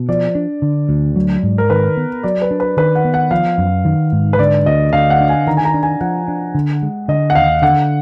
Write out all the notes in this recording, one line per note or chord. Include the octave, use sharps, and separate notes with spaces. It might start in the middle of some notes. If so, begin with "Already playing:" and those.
Already playing: B2
F3 D5
D4
D3
D2
F#3
G#2
A#4
D#3 B4
B3
F#3 D5
B4
D4
B4
D#3 B4
F#5
B3
F#5
F3 F5
F#2
D#3
G#2
B4
D3 D5
D2 D#5
D3 F5
F#5
D4
G#5
D#3 A#5
G#5
A#5
D4
G#5
F3 F#5
D4
D3
G#3
D3 D#5
F#5
D#2 F5
D3 F#5